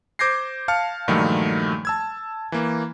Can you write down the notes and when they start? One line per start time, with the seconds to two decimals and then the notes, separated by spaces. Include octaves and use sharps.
0.19 C5 D6 G6 G#6 A#6 C7
0.68 F5 A5 F6 C#7
1.08 G2 A#2 D#3 F3 F#3 A3
1.85 A5 E6 G#6
2.52 E3 A#3